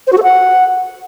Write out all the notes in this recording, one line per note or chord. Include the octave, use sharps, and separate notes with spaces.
C5
F#4
A4
F#5